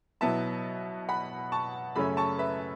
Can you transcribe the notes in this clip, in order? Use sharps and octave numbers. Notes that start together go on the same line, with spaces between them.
B2 F#3 B3 E4 E5 A5
F#5 B5
A5 C#6
F#2 C#3 A3 C#4 B5 E6
A5 C#6
B4 E5